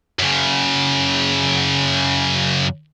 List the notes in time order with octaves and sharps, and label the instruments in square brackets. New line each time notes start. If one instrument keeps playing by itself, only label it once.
[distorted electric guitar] F#2 C#3